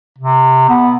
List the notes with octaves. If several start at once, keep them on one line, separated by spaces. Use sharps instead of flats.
C3
B3